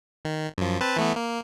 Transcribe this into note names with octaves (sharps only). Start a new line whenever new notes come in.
D#3
F#2 F3
C4 B4 A5
E3 A3 B3
A#3